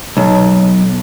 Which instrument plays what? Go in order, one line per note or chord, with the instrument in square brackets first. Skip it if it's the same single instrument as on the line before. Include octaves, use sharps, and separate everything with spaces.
[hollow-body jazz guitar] B1